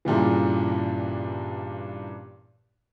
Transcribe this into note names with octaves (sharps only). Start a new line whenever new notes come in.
G2 A#2 C#3 E3